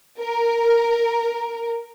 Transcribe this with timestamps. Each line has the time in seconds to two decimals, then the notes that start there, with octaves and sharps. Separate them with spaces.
0.20 A#4